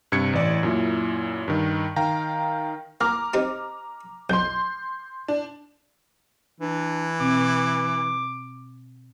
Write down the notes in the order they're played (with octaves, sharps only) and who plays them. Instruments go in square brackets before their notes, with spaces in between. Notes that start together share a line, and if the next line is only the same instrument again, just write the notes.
[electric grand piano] G2 C3 G#6 C#7
A1 E3 D5
F#2 A#2 E4
G2 D#3
D#3 F5 G5 A#5
[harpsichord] A#3 [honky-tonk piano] A#5 D6 F6
[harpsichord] C4 D#4 G4
[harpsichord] B1 [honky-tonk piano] C6 G6
[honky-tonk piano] D4
[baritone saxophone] E3 [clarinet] D4
[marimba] B2 C4 [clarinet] D6